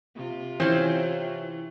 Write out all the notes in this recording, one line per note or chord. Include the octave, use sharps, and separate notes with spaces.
C3 F4
E3 C4 C#4